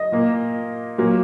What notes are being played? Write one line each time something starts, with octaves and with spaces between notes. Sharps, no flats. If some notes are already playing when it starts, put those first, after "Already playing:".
Already playing: D#5
A#2 A#3
A#2 F#3 A#3